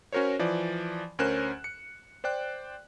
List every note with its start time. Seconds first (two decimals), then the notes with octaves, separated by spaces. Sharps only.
0.13 C#4 F#4 A#4 C5 C#5
0.39 E3 F3 D5
1.19 D2 C#4 A#4 C5 F#6 E7
1.64 C#7
2.24 C5 D5 G5 F#6